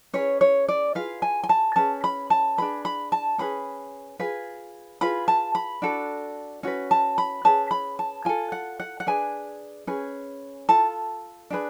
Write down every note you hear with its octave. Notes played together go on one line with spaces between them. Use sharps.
C#4 G#4 B4 C#5
C#5
D5
F4 G#4 B4 F5
G#5
G#5
A5
C#4 G#4 B4 A5
B5
A5
D4 G#4 B4 B5
B5
A5
C#4 G#4 B4 B5
F4 G#4 B4
F4 G#4 B4 B5
A5
B5
D4 F#4 A4
C#4 F#4 B4
A5
B5
C#4 G#4 B4 A5
B5
A5
F4 A4 G#5
F#5
F#5
F#5
D4 G#4 B4 G#5
C#4 G#4 B4
F4 A4 A5
D4 G#4 B4